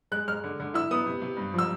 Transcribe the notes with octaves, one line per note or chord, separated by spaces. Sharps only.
G#3 F#6
G#3 F6
D3
D3
E4 E6
B3 D#6
C3
C3
G2
F3 E6